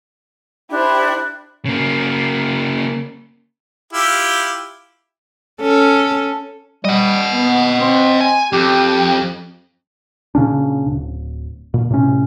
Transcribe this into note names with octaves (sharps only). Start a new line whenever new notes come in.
D4 E4 G4 C5
C#3 A#3
E4 F4 G4
C#4 A4
G3 D#5 F#5
B3
C4
G#5
F2 G4
A#2 C#3 C#4 D4
D1
A#2
A2 C3 C#4